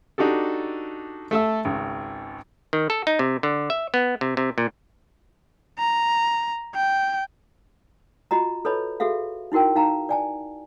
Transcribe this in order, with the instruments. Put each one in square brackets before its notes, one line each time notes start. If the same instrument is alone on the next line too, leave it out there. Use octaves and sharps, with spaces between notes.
[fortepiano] D4 D#4 F#4 G4 A4
A3 A4 E5 E6
G#1 C#2
[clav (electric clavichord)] D#3
A4
D#4
C3
D3
E5
B3
C3
C3
A#2
[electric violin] A#5
G5
[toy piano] F4 F#4 D#5 A#5
A4 B4 C#5 D#5 A5 B5
F#4 G#4 A4 E5 F5
D#4 E4 F#4 A#4 G5
D#4 F5 A5 A#5
D5 G#5 A5